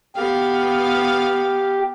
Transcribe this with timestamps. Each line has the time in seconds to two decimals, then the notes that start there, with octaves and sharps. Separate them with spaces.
0.15 B3 G4 F5